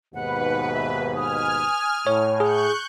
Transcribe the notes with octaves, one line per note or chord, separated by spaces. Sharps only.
D#2 G#2 B2 B4 F#5
E5
G#5 D#6 F6
A2 C#5
G#4 C#6 F#6 G6